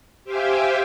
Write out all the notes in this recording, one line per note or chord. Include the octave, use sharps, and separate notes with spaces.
G4 C5 E5 F5 G5 G#5